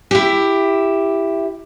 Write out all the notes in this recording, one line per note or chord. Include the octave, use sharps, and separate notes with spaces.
E4 G4